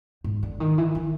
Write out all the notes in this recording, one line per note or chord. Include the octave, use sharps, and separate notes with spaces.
G#2
D3
D#3
E3
D#3